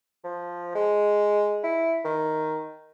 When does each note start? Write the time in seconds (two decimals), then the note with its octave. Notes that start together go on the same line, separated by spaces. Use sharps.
0.24 F3
0.75 G#3
1.63 E4
2.04 D#3